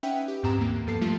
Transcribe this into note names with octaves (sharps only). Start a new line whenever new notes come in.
C#4 D#4 B4 E5 F#5 G5
G4
F2 G#2 C4 G4 A#5 E7
D#2 D3 E3 A#3
G2 F3 B3 A4 A5 C7
G2 F3 G3 A3 D4 F4